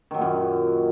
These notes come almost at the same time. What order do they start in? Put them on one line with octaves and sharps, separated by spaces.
D#3 F#3 A#2 F#2